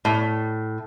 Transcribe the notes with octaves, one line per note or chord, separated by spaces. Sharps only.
A2